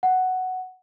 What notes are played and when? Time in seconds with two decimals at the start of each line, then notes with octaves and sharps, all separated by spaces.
0.03 F#5